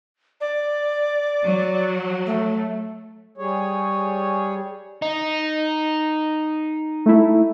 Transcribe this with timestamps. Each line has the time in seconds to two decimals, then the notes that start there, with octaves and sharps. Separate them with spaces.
0.41 D5
1.44 F#3
2.26 A3
3.38 G3 G#4 C#5
5.02 D#4
7.06 A3 E4